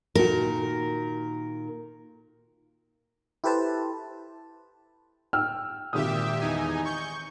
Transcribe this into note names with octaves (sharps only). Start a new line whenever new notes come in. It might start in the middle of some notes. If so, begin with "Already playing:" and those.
A#2 D#3 F#4 A#4
E4 G4 A4 B4 C5 A5
G5 E6 F6
G#1 A#2 G4 E5 D#6
E2 D#4 G#5
C#6 G6